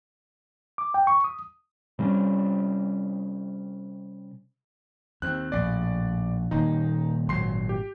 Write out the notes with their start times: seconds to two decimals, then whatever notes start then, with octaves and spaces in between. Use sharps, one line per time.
0.78 D6
0.94 G5
1.07 C#6
1.24 D#6
1.99 C3 G3 G#3 C#4
5.22 D#2 C4 F#6
5.52 A#1 A2 D5
6.51 D#1 D#2 A#3 D#4
7.29 G#1 A#2 F#3 C6 C7
7.69 G4